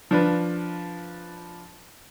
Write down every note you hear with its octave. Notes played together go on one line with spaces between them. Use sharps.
F3 D4 B4